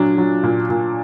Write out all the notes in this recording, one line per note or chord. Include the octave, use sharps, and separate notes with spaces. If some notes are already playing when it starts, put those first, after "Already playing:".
Already playing: A#2 F#3 D4
F#3
A#2
A#2